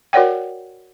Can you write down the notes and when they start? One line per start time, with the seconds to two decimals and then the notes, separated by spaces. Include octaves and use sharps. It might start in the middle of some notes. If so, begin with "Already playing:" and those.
0.13 F#4 A#4 C#5 D5 F#5 G5